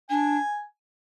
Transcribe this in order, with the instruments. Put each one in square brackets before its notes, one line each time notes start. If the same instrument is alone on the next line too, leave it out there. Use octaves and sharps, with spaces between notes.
[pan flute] D4 [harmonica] G#5